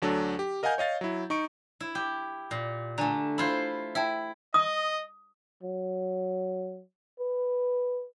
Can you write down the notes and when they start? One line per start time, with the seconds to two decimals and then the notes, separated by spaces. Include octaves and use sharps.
0.02 D2 F#3 D4 A4
0.39 G4
0.63 A#4 D#5 F5 F#5 G#5 G6
0.78 C#5 D#5 F5 A6
1.01 F#3 E4
1.30 D#4 C#6 D7
1.80 E4
1.95 G4
2.51 A#2
2.98 D3 A3 G#5 A#5
3.38 E4 F4 C5 B5
3.95 E4 E5 G5 A5
4.54 D#5 D#6
5.63 F#3
7.19 B4